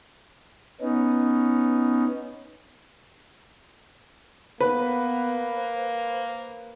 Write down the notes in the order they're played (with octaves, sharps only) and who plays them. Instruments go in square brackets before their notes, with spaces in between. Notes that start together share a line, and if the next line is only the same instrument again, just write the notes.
[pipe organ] B3 C#4 D#4
[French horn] A#3 [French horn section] B3 [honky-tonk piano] B4
[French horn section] C5